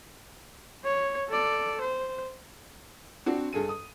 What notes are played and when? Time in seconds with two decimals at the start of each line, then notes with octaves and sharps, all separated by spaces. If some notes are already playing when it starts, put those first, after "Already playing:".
0.85 C#5
1.29 A4 D5
1.81 C5
3.26 C4 D4 F#4
3.53 G2 G#4 A4 D#7
3.69 D#6